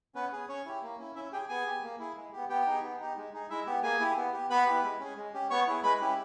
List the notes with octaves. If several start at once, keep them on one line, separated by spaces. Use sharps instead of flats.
B3 C#4 B4
G#4
C#4 C#5
E4 G4
A#3
C#4 E4
C#4 E4 E5
G4 G#4 G5
B3 G#4 G#5
G4
A#3
E4 G#4
G#3
B3 G4
B3 G4 G5
D#4 G#4
B3
D#4 G4
G#3
D#4 G#4
G#3 E4 E5
B3 G4
A#3 G#4 G#5
E4 G4
B3
G4
B3 B4 B5
E4 G4
G#3
C#4 G#4
G#3
C#4 G4
B3 C#5 C#6
E4 G#4
G#3 B4 B5
C#4 E4 G4